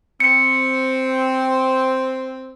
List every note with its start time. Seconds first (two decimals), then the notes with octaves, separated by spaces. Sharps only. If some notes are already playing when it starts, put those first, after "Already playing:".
0.20 C4 C#7